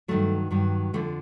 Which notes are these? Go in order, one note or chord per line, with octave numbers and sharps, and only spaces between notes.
G2 D#3 F#3 A3
G2 D#3 F#3
F2 D3 F3 A3